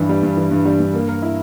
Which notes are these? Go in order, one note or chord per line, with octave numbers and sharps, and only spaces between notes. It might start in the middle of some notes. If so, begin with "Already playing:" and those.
Already playing: G2 E3
G3
G2
E3
G2
G3
G2
A#3
A#4
E4